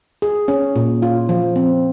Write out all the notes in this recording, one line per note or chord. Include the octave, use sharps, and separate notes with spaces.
G#4
C#4
A#2
F4
F3
C4